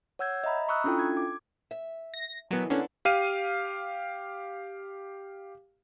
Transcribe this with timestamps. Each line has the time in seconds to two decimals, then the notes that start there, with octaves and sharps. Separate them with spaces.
0.19 C#5 F#5 E6 G6 G#6
0.44 D#5 E5 A#5 B5
0.68 A#5 B5 C#6 D#6 E6 F#6
0.84 C#4 D4 E4 F4 A4 G5
0.99 G#6
1.17 D6
1.71 E5
2.14 A#6
2.51 B2 D#3 E3 F#3 B3
2.70 D3 A#3 B3 C#4 D4
3.05 G4 F5 D#7